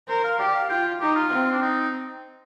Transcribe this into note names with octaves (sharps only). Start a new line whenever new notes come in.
A#4 C5
F5
G4 D5
F5
F4 G5
D#4 G4
F4
C4
D4
D#4